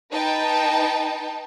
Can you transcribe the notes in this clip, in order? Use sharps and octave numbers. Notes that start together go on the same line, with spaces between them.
D#4 B4 G5 A5